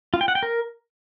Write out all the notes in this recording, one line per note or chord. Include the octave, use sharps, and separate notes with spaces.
F4
G5
F#5
G5
A#4